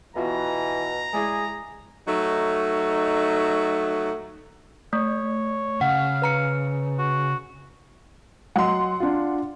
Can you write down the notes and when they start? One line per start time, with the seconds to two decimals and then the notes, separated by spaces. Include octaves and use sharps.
0.16 B2 E3 B3 F4 F#4 A#5
1.13 G#3 E4 G#4 D5
2.07 F#3 A3 D#4
4.93 A3 C#5
5.81 C#3 F5 F#5
6.22 B4 A#5 C#7
6.98 F#4
8.56 F#3 D#5 F#5 C6
9.00 D4 F4